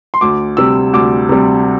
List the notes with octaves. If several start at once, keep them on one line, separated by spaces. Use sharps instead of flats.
C6
D2 D6
C3 G3 E6
D2 D6
C3 G3